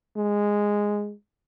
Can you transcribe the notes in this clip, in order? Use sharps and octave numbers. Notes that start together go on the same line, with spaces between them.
G#3